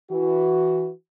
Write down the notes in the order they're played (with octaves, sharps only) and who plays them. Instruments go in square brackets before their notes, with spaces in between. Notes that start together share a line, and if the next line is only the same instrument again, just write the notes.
[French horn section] E3 F#4